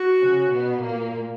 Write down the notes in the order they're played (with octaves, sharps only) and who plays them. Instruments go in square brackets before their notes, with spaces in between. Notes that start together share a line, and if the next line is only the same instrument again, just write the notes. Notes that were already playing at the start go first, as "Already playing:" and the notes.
Already playing: [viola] F#4
[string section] C#3 C#4
B2 B3
A#2 A#3